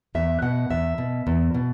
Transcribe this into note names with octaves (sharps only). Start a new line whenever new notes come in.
E2 E5
B2 F#5
E2 E5
B2
E2
B2